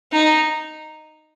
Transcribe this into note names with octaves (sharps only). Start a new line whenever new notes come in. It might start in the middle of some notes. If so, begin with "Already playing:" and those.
D#4